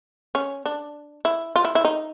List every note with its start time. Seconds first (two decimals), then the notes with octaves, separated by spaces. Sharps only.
0.35 C#4
0.66 D4
1.25 E4
1.56 F4
1.65 E4
1.75 E4
1.85 D#4